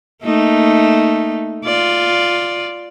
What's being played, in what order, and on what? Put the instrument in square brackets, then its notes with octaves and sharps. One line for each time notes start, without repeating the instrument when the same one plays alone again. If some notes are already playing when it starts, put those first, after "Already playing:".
[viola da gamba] A3 A#3 D#4
F4 D5